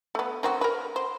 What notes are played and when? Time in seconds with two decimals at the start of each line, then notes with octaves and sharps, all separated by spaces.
0.15 A3 B3
0.43 D#3 C4 F#4
0.61 A#4 B4
0.96 C5